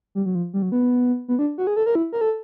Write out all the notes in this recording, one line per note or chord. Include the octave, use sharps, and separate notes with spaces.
G3
F#3
F3
G3
F#3
B3
B3
D4
F#4
G#4
A4
A#4
E4
A#4
A4